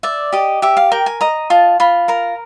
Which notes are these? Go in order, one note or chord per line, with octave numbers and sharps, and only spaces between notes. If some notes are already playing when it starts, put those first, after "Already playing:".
D5 E5
G4 D#5
G4 E5
F5
A#4 G5
G#5
D#5 A#5
F4 A5
F4 B5
A#4 A#5